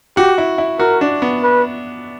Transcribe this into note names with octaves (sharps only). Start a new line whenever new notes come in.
F#4 G4
E4
E4
F#4 A#4
D4
B3
B4